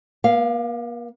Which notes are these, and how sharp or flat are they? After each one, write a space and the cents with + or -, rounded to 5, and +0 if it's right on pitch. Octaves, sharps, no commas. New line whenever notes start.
A#3 +45 F5 -10